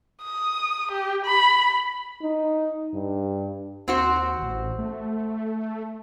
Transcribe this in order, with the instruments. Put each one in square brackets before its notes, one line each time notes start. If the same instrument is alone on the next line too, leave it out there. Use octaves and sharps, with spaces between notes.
[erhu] D#6
G4
B5
[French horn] D#4
G2
[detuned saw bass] D#2 [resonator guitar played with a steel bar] C4 F#4 C5
[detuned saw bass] A1
A3